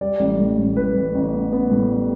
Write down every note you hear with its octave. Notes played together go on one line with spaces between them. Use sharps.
G3 D5
A1
A2
A1
A2 B4
A1
A1
B3
B3
A2
G3